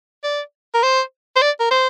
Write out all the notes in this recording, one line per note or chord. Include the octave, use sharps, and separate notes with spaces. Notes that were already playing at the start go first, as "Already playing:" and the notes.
D5
A#4
C5
C5
D5
A#4
C5